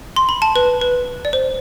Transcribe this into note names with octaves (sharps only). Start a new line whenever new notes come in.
C6
B5
A5
B4
B4
D5
C5